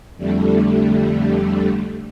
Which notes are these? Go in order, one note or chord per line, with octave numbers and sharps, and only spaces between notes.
F2 D3 G3 A3